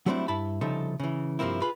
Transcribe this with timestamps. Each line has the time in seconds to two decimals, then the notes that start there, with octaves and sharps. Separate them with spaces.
0.06 F#3 G3 A3 C4 D4 E4
0.28 G2 E4 A5 B5
0.61 C2 C#3 F3 D#4 A4 E5
1.00 C#3 E3
1.39 G2 C3 F3 A#3 C4 E4
1.62 F4 G#4 B4 B5